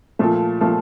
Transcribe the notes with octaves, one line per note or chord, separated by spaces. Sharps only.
A#2 F3 A3
A#2 F3 A3